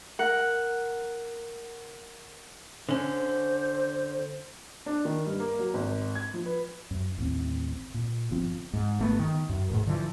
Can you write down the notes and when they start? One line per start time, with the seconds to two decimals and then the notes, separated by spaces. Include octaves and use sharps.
0.19 A#4 F#5
2.89 D3 C#4 C5
4.86 D4
5.05 D#3
5.26 G2
5.39 A#3
5.59 F#3
5.74 G#1
6.15 G#6
6.34 F3
6.46 B4
6.91 F#2
7.17 A1 D#2 C4
7.94 A#2
8.31 G1 F3 C4
8.73 G#2
8.99 G1 A3 B3
9.19 D#3
9.49 F#2
9.70 A1 G#2
9.87 D3 E3 F3